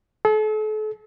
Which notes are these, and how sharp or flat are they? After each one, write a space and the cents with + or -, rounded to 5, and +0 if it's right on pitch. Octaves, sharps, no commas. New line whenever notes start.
A4 -40